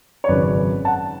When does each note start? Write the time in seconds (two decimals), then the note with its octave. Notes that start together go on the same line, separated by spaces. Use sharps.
0.24 C#5
0.28 G#1 F#2 C#3 B4 D5
0.85 F#5 A5